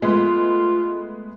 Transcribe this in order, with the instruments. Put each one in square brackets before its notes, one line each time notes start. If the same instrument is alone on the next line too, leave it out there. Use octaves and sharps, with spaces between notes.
[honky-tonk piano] G#3 A3 B3 [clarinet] F4